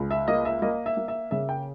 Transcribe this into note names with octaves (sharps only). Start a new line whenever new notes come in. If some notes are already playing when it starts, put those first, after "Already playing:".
Already playing: C#2
E5
A#3 D#5
E5
A#3 D#5
E5
A#3
E5
C#3 E5
G5